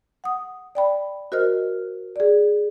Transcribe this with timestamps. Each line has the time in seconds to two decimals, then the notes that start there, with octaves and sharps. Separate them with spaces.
0.24 F#5 D#6
0.75 D5 G5 B5
1.32 F#4 A#4 C5 D#5 F6
2.16 G#4 D5